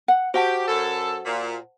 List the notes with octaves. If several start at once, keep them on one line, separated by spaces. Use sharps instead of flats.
F#5
F#4 G4 C5 F#5 A5
F#2 A4
A#2